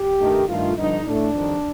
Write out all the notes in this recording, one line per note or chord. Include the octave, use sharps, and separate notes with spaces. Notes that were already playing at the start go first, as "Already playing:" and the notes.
Already playing: G4
G2 D#3 A3
G2 D#3 A3 F4
G2 D3 F3 D#4
A2 A3 D4
F2 D#3 G3